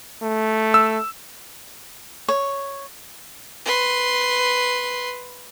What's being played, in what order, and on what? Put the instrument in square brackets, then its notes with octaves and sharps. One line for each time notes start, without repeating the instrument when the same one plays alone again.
[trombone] A3
[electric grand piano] E6
[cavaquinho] C#5
[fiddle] B4 C6